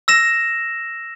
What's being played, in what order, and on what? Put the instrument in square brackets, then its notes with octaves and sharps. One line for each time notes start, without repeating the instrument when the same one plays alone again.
[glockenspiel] E6 A#6 E7